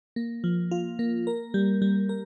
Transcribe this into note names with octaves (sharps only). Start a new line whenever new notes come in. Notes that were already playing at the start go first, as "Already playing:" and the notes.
A#3
F3
F4
A#3
A#4
G3
G3
A#4